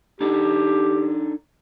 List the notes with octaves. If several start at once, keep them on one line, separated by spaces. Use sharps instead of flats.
D4 D#4 G4 A4